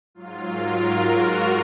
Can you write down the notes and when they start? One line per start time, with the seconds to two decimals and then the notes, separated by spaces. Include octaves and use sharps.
0.15 G#2 F#3 F4
0.48 A#4
0.82 F#4
1.16 F4